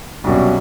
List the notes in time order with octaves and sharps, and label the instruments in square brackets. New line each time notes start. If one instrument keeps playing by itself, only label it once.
[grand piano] C2 B2 F#3 A#3 C#4